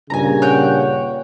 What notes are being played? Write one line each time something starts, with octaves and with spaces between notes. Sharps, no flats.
G2 A#2 C#3 G#5 A#5
C#5 F#5 G5